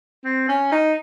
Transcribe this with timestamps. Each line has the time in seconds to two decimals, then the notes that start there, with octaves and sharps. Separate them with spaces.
0.24 C4
0.48 C#4
0.72 D#4